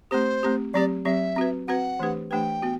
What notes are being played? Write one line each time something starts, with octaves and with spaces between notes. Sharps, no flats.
A3 C4 G4 C5
A3 C4 G4
F#3 C4 G4 D5
F#3 C4 G4 E5
C4 F#4 B4
C4 F#4 B4 F#5
E3 A3 D4 G4 B4
E3 A3 D4 G4 B4 G5
B3 F#4